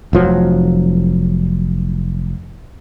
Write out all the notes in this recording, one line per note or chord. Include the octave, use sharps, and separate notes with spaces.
F1 F3 F#3